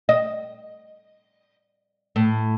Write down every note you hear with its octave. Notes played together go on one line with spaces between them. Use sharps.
D#5
A2